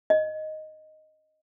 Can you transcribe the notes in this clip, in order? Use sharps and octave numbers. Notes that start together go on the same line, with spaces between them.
D#5